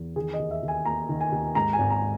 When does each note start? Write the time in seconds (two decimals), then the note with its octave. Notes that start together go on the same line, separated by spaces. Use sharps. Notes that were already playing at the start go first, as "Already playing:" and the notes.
Already playing: E2
0.16 D#3 G#4
0.33 D#5
0.39 D#2
0.51 E5
0.63 D#2
0.68 G#5
0.85 A#3 A#5
1.09 D#3
1.21 G#5
1.32 D#2
1.55 G#2 A#5
1.73 G#5
1.78 G#1
1.90 A#5